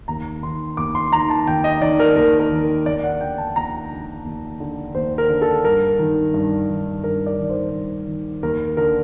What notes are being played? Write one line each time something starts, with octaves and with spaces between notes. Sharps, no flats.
D#2 A#5
D#3 C6
D#2 D6
C6
D#3 A#5
A5
D#2 G5
D#5
D#3 D5
A#4
D#2 A#4
A#4
D#3
D#2 D5
F#5
D3 G5
A5
D#2 A#5
D3
D#2
D3
D#2 C5
A#4
D3
A4
G2 A#4
D#3
G2
D#3
G2 A#4
D5
D#3
C5
G2
D#3
D#2 A#4
D3 A#4